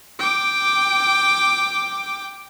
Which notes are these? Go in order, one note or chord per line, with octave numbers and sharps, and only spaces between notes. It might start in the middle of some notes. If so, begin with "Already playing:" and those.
G5 D6